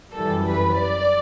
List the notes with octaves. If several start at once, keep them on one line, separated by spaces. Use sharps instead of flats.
F#2 E3 G3 A4
B4
D5